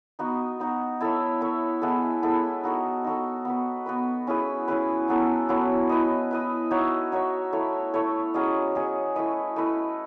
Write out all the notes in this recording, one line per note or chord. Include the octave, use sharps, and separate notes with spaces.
B3 D#4 F#4
B3 D#4 F#4
E4 A4 C#5 E5
E4 A4 C#5 E5
G#3 B3 E4 A4
G#3 B3 E4 A4
D#4 F#4 A4
D#4 F#4 A4
B3 F#4 B4
B3 F#4 B4
C#4 E4 G#4 B4
C#4 E4 G#4 B4
F#3 B3 E4 A4
F#3 B3 E4 A4
E4 B4 D#5
E4 B4 D#5
D#4 F#4 C#5 E5
D#4 F#4 C#5 E5
A3 E4 A4 C#5
A3 E4 A4 C#5
F#3 C#4 G#4 D#5
F#3 C#4 G#4 D#5
A3 E4 B4 D#5
A3 E4 B4 D#5